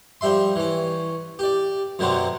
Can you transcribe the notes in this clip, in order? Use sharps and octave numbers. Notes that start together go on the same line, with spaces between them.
F3 G3 E5 C6
E3 C#4
G4 D5
F#2 B2 D3 F#3 B3 C4